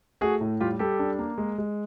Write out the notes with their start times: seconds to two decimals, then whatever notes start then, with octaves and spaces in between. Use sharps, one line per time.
0.21 A3 F#4 G#4
0.41 A2
0.60 G3 F4 G4
0.79 G3 G4 A4
0.99 D4
1.19 A#3
1.38 G#3
1.58 G#3